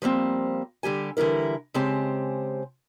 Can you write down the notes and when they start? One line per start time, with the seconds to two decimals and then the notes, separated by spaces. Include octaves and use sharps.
0.02 F3 G3 A#3 C4
0.83 D3 G3 G4 G#5
1.17 D3 E3 G3 E4 A#4
1.74 C#3 G#3 C4 G4 C5 A5